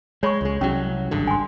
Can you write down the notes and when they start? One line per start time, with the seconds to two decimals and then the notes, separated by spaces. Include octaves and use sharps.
0.23 G#3 C#5 B5 C#6
0.41 C#2 G#3
0.61 C2 F#3 C#4
1.11 G#1 G2 D3
1.27 G#5 C6